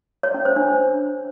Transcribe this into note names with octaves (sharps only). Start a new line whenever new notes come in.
C#5
C#4
C5
D4